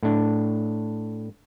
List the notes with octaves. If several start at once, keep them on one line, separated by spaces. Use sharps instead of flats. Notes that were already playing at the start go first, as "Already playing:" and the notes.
A2 D4